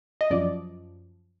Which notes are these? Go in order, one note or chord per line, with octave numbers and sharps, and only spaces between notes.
D#5
F#2 F3 D5